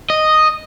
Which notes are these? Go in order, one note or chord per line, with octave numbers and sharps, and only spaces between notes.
D#5